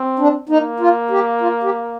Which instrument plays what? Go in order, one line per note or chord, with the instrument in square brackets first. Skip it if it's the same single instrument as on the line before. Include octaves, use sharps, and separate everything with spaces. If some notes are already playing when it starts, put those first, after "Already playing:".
Already playing: [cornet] C4
[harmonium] D4
[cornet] A#3 [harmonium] D#4
[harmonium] F4
G4
F4
G4